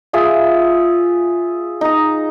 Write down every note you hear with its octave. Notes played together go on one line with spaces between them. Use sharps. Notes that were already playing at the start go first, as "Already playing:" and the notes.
F4 G#4 E5 G#5
D#4 A#5